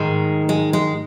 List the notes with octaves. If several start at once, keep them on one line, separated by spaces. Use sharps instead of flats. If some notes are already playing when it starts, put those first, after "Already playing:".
Already playing: G#2 D#3 G#3
G#3
G#3